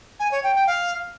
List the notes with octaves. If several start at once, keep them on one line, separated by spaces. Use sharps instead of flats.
G#5
C#5
G5
G5
F5